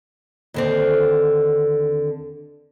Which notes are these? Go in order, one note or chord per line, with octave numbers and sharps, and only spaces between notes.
D#2 D3 C4